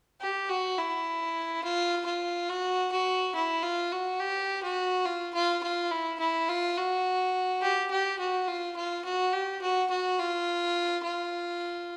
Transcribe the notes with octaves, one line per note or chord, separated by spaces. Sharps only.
G4
F#4
E4
F4
F4
F#4
F#4
E4
F4
F#4
G4
F#4
F4
F4
F4
E4
E4
F4
F#4
G4
G4
F#4
F4
F4
F#4
G4
F#4
F#4
F4
F4